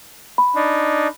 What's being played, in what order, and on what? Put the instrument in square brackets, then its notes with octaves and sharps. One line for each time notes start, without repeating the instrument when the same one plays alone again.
[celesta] B5
[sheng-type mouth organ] D4 D#4